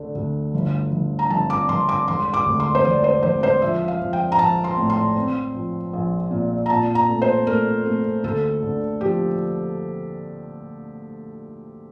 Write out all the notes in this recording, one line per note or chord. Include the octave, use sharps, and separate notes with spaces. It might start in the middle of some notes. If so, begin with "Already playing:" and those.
Already playing: D2 D3 A3
D2
G1
G1
A#5
G1 A5
D6
G1 C6
D6
E1 C6
D6
D2
C6
C5
E1 D5
C5
E1 C5
C5
F3 E5
F5
F3
G5
A#5
A#1 A5
C6
A2
C6
C4
F3
A#1
A#2
A#5
A#2 A5
A#5
A3
C5
A3 A#4
A3
D2 A4
D3
F3 G4